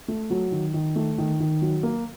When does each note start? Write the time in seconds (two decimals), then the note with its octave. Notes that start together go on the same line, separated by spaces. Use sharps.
0.08 A3
0.30 F#3
0.52 D#3
0.74 D#3
0.96 A3
1.18 D#3
1.40 D#3
1.62 F#3
1.83 A#3